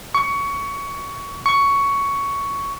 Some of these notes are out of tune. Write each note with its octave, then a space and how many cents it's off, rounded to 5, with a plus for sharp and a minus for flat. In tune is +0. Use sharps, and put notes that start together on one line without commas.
C#6 +20
C#6 +10